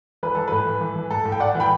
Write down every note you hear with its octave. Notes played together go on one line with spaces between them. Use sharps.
E3 B4
E3 A4
A2 B4
E3
E3
E3
A2 A4
A2
G5
A2 D5 F#5
E3
G5 B5